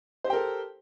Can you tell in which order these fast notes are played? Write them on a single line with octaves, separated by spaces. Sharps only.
C5 G4 G5 A#4 A4